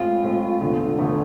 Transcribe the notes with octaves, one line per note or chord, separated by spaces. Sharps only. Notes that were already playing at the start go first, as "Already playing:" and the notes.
Already playing: A2 G#3 C4 F4
A2 G#3 C4
E1 E2 D3 A3
E1 E2 D3 A3